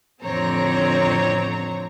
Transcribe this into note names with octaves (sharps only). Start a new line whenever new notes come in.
A1 F2 D3 C4 C#5 A#5